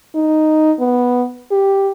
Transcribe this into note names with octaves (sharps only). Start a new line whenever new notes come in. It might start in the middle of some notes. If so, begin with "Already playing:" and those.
D#4
B3
G4